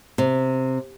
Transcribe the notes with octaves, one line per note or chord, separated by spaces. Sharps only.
C3